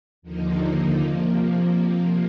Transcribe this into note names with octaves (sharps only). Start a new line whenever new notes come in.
D#2 D3 F3 A#3 D#4
C3 F3 A#3